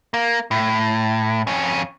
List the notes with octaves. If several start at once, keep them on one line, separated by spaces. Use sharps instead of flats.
A#3
A2
F2 C#4